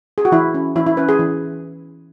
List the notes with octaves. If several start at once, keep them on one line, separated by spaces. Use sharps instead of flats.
G#4
F#4
E3 E4
C#4
E3 E4
E4
C#4 B4
G#4
E3